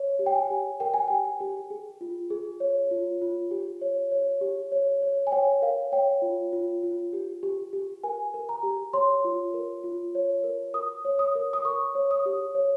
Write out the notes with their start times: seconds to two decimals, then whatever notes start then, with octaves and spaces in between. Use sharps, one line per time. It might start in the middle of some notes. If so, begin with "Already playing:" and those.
Already playing: C#5
0.19 G4
0.26 G5
0.35 G#5
0.50 G4
0.80 A#4 G5
0.94 G#5
1.08 G4 G5
1.40 G4
1.70 G#4
2.01 F4
2.30 G#4
2.60 C#5
2.91 F4
3.22 F4
3.51 G4
3.81 C#5
4.11 C#5
4.41 G4
4.72 C#5
5.02 C#5
5.27 G#5
5.32 C#5 G5
5.62 A#4 F5
5.92 C#5 G5
6.22 F4
6.53 F4
6.83 F4
7.13 G4
7.43 G4
7.73 G4
8.03 A#4 G#5
8.34 A#4
8.49 A#5
8.63 G4
8.93 C#5 C6
9.24 F4
9.54 A#4
9.84 F4
10.15 C#5
10.44 A#4
10.74 A#4 D#6
11.05 C#5
11.19 D#6
11.35 A#4
11.53 D#6
11.65 A#4 C#6
11.95 C#5
12.11 D#6
12.26 G4
12.55 C#5